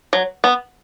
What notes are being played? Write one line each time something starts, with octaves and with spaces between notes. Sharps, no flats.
F#3
B3